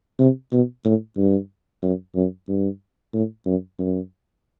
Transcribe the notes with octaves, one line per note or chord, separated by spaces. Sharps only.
C3
B2
A2
G2
F#2
F#2
G2
A2
F#2
F#2